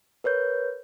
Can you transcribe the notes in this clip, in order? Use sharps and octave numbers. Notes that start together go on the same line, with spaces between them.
A#4 B4 C#5 G6